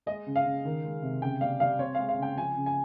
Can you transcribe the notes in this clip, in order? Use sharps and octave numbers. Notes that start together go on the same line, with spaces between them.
G#3 D#5
C#3
F5
C#3
D#3
G#3
C3
C#3 G5
G3 F5
G3 F5
C4 C#5
G#3 F5
F5
C#3 G5
F3 G#5
C#3
G#5